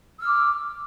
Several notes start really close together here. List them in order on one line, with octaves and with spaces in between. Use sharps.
E6 F6 D6